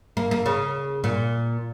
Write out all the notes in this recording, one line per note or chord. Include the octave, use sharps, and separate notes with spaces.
A#3
A#3
C#3
A#2